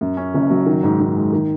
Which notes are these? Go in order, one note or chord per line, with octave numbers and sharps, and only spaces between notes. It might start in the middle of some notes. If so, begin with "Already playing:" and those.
F#2
C#4
F#1
F#3
D#3
G#2
G#2
G#3
D#3